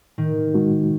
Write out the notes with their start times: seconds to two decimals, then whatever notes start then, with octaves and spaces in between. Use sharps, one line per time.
0.18 A2 D#3
0.54 G#3 D#4 F#4